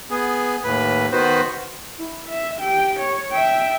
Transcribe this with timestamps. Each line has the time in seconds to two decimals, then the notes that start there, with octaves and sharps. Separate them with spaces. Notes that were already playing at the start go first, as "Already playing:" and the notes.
0.10 B3 G#4
0.64 D#2 A2 B4
1.12 D#3 B3 F#4 B4 C5
1.99 E4
2.29 E5
2.59 G4 G5
3.00 C#5
3.32 E5 G5